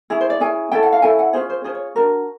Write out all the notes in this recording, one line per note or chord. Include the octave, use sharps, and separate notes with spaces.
C#4 E4 G#4
C5
D5
C#4 E4 G#4 G#5
C#4 E4 A4 G5
F#5
F5
C#4 E4 A4 G#5
F#5
C#4 F4 G#4 C5
C5
C#4 F4 G#4 C5
C#5
D4 F#4 A#4